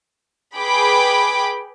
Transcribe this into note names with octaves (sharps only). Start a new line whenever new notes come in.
G#4 B4 G5 B5 D6